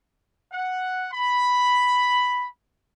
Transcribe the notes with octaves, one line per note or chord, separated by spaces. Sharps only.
F#5
B5